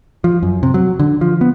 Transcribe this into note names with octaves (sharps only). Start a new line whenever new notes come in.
F3
F#2
C3
F#3
D3
F3
B3